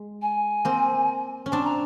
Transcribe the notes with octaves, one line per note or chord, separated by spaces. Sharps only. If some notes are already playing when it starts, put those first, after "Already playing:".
Already playing: G#3
G#5
A#3 C4
C#4
C4 D4 A5
A#5